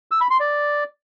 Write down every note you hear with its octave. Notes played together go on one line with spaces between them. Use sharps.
E6
B5
C6
D5